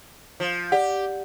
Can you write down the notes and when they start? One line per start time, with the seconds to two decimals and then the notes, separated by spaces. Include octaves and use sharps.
0.40 F3
0.72 G4 D5 F#5